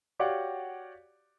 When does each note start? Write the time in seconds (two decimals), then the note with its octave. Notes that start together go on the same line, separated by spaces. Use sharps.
0.19 F#4 G4 C#5 D5 F5 F#5